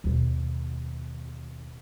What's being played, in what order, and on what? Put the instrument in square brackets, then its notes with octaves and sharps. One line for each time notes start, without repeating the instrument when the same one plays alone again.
[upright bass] D#2 B2